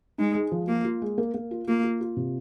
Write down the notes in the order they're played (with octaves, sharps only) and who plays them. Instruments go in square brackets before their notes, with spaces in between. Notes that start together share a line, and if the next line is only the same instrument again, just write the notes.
[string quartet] G#3 [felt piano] D#4
[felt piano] G#3
F3
[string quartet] A#3 [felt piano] F4
[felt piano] F4
G#3
A#3
A#3
F4
[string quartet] A#3 [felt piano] F4
[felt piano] F4
F4
C3